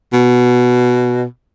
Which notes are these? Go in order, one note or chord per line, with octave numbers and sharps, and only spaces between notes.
B2